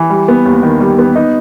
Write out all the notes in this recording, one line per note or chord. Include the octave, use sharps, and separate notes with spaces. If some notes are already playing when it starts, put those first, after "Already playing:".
Already playing: E3
G3
B3
D#2
D#3
G3
B3
D#4